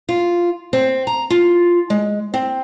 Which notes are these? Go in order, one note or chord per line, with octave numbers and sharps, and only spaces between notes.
F4
C4
A#5
F4
G#3
C4